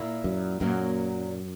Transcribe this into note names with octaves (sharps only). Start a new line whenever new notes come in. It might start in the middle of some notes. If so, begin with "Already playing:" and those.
Already playing: A#2 A#3 E4
F#2
F#2 A#2 F#3 A#3